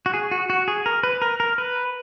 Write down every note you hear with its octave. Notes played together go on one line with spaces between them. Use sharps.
F#4
G#4
F#4
F#4
G#4
A#4
B4
A#4
A#4
B4